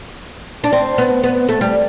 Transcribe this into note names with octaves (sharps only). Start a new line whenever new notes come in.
D4
C4
B3
B3
A3
G3